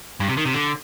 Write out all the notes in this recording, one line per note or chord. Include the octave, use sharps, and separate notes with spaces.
G2
C3
D#3
C3
D3